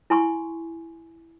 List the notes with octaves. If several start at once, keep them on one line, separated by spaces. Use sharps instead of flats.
E4 G#5 C6 C#6